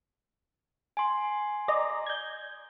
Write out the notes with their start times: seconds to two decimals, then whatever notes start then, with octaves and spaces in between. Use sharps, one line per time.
0.97 G#5 C6
1.68 D5 D#5 A#5
2.06 G6 G#6